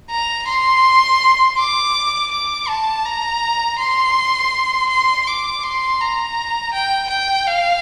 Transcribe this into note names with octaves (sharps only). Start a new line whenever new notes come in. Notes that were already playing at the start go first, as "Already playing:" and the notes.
A#5
C6
D6
D6
A5
A#5
C6
C6
D6
C6
A#5
G5
G5
F5